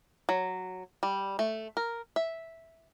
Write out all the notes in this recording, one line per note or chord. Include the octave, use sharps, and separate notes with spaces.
F#3
G3
A3
A#4
E5